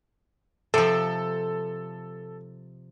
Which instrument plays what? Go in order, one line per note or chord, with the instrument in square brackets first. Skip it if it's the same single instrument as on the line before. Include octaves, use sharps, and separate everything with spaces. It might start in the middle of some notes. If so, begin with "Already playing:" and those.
[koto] C3 F3 [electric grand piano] A4